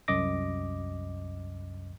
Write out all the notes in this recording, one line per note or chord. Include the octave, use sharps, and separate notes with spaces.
C2 F#2 D#5 D6 A#6